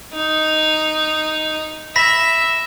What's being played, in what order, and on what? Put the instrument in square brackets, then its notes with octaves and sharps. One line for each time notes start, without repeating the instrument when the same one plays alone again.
[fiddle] D#4
[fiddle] E5 [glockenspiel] B5 A#6 B6